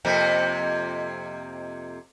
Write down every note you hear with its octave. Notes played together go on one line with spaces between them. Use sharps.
F2 C3 A#3